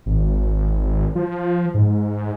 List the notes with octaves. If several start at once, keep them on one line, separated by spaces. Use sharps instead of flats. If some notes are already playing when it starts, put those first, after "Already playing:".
G#1
F3
G#2